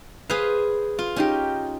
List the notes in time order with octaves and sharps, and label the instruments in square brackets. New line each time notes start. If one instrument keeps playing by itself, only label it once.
[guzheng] G#4 B4 [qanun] C5 F5
[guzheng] F4
[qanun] C#4 D#4 G4